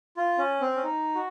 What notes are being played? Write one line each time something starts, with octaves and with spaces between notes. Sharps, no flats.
F4
C#4
C4
C#4
D#4
F#4